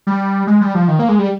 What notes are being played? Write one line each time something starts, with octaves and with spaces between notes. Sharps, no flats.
G3
G#3
G3
F3
D#3
A#3
G#3
G3